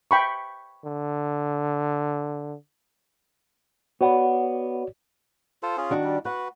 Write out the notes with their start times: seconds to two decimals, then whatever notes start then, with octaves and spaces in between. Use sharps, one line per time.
0.11 G5 B5 C#6
0.85 D3
4.01 B3 F#4 C#5 D5
5.63 F4 A4 C5
5.77 C#4 F4 G#4
5.90 D#3 D4 F#4
6.04 G3
6.25 F#4 B4 F#5